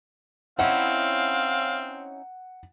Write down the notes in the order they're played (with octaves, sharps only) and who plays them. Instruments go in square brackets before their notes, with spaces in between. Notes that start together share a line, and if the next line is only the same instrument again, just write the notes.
[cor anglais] C4 [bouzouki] C#4 D#4 E4 [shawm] F5 [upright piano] F#5